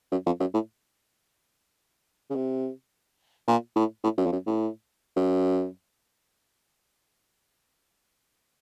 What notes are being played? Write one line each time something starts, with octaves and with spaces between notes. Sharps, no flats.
F#2
F2
F#2
A2
C#3
C3
A#2
A2
A2
F#2
F2
F#2
A2
F#2